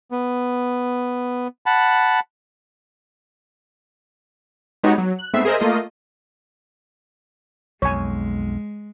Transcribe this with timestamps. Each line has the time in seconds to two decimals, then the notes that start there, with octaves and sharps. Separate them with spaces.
0.11 B3
1.66 F#5 A5 B5
4.83 G#3 B3 D#4 F#4 G4 C#5
4.98 F#3
5.19 F#6
5.33 G#2 A3 B3 C4 E5 C7
5.45 G#4 A#4 C5 D#5 E5
5.60 A3 A#3 F4 D#5
7.82 B1 F2 G#3 C#5 G#5